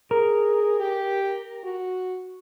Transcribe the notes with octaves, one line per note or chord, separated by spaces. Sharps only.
G#4 A#4
G4
F#4